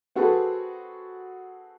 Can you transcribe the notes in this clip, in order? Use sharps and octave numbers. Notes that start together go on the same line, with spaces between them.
C4 F#4 G#4 A4 B4